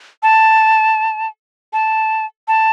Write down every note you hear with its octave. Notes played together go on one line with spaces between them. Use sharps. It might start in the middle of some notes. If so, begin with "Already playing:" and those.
A5
A5
A5